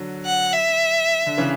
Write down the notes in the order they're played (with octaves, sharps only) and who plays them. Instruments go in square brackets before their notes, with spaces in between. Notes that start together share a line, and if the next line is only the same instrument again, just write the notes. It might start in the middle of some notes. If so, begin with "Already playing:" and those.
Already playing: [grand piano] D3 F#3
[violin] F#5
E5
[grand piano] D3
C#3 E3